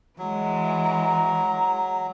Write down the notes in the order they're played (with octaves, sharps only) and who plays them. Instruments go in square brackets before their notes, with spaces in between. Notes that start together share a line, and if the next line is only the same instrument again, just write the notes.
[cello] E3 G#3 [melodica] F#3
[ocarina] A#5